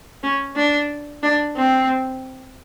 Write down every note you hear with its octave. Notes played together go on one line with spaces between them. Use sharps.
C#4
D4
D4
C4